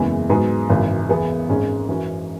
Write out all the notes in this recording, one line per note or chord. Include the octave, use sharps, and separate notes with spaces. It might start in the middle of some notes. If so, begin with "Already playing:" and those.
Already playing: F#1 E2 C#3 E3 G#3
G#2 F#3 B3 G#4
G#1 F#2 C#3 E3
E2 E3 B3 G#4
G#1 G#2 G#3 C#4
F#2 E3 C#4 F#4